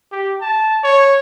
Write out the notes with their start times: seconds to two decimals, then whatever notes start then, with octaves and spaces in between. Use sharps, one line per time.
0.12 G4
0.41 A5
0.84 C#5